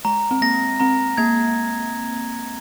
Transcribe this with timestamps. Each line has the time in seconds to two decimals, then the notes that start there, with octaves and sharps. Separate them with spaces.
0.05 G#3 A#5
0.31 C4
0.42 A#3 A#6
0.80 C4 A#5
1.18 A#3 G#6